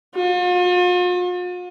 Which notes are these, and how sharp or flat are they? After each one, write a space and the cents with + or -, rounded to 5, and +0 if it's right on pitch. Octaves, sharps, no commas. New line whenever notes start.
F4 +45